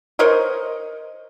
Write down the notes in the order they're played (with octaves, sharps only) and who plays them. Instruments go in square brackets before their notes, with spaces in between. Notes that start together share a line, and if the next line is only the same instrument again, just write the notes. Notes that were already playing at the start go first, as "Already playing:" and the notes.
[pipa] A#4 C5 C#5 D#5